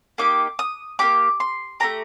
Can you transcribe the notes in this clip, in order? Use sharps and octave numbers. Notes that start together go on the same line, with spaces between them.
A#3 D#4 G4 D6
D#6
A#3 D#4 G4 D6
C6
A3 D4 G4 A#5